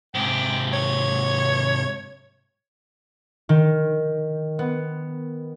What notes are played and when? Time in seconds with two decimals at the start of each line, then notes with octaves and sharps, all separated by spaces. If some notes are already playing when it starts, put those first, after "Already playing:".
0.15 G#2 C3 G5
0.73 C#5
3.49 D#3
4.59 B3